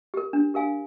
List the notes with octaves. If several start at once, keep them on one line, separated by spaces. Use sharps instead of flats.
G4 A#4
D4
G4 A#4 F5 G#5